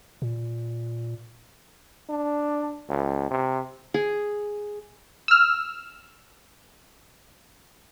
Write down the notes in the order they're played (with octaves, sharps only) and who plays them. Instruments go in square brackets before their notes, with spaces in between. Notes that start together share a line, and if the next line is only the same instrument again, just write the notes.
[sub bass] A#2
[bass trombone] D4
C#2
C3
[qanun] G#4
[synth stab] E6 F6